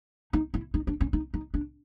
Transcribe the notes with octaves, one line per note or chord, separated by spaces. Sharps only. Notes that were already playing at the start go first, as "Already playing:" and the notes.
D#4
E4
D#4
D4
C#4
D#4
D#4
D4